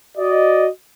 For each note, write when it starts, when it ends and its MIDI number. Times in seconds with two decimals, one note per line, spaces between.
0.18 0.68 66
0.18 0.68 74
0.18 0.68 75